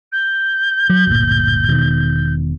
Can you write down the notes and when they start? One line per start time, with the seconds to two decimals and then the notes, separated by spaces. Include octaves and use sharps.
0.12 G6
0.90 F#3
1.07 D1 G1 A#2
1.68 E1 B2 D#3